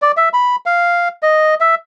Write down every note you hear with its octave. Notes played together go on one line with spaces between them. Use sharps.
D5
E5
B5
F5
D#5
E5